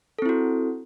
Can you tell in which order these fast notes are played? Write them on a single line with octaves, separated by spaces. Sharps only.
A4 C4 E4 F#4